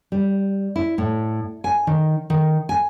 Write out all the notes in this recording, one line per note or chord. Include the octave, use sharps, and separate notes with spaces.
G3
E4
A2
G#5
D#3
D#3
G#5